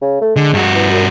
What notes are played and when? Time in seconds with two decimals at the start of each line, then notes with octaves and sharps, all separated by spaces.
0.02 C#3
0.21 A3
0.36 D3 G#3
0.54 G2 F#4
0.75 E3
0.91 F#2